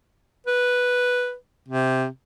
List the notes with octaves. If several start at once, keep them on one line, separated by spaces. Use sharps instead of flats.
B4
C3